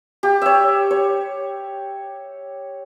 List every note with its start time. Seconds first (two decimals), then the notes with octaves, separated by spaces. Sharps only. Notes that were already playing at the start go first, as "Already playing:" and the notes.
0.23 G4
0.42 C#5 E5
0.91 C#5